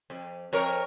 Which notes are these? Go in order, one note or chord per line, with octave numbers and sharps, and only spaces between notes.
F2
F2 A#4 C#5